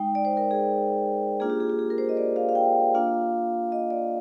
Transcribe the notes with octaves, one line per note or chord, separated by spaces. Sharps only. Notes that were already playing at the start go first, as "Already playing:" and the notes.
Already playing: G#3 D#4 G5
D5
C5
A#4
G#4
A#3 D4 F4 G#4
G4
G#4
G4
G#4
A#4
C5
D#5
D5
F5
F5
G5
A#3 D4 F4 F5
D#5
D5